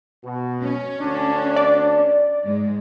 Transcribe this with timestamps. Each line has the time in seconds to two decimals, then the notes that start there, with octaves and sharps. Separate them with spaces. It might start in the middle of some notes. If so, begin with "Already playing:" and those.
0.24 B2
0.63 C#4
0.99 D2 D4
1.56 D5
2.45 G#2 G#3